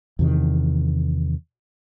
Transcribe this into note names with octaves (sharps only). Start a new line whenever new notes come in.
E2 C3 D#3